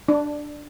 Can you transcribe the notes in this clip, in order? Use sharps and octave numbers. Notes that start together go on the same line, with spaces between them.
D4